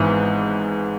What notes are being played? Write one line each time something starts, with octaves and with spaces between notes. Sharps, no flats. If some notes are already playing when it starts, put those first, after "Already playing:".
Already playing: G#1 G#2 E3 B3